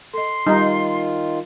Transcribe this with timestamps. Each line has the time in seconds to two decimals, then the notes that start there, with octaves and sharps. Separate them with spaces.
0.14 A4 D#5 C6
0.47 D#3 G3 D#4 F4 G4